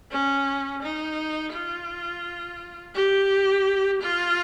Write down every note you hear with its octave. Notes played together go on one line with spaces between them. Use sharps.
C#4
D#4
F4
G4
F4